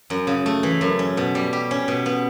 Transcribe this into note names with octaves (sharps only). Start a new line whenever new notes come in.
F#2
C#3
A3
E3
F#2
C#4
B2
G3
G4
C#4
B2
B3